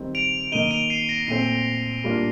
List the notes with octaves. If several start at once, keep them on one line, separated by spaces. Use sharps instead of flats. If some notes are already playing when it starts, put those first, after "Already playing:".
Already playing: D#3 G3 C4
D7 F7
D#3 A#3 D#4 D#7 G7
D7 F7
C7 D#7
A#6 D7
A#2 A3 C4 C7 D#7
A2 G3 A#3 D4 F4